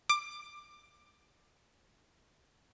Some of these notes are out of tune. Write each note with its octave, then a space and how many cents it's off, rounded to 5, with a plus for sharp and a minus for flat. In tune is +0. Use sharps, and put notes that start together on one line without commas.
D6 +20